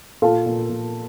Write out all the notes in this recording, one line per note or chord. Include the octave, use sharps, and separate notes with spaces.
A#2 F4 A4
A#2
A#2